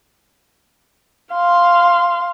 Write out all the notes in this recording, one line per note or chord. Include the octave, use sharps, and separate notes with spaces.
F5 C6